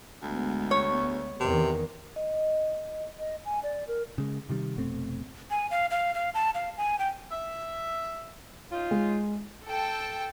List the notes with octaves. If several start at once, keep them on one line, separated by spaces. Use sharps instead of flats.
D2 G#3 B3
C#5
E2 C3 D#3
D#5
D#5
G#5
D5
A#4
C#3 G#3
C3 D#3 G3
F1 B2 A3 C4
G#5
F5
F5
F5
A5
F5
G#5
G5
E5
C#4 D#4 F4
G#3
A4 G5 A5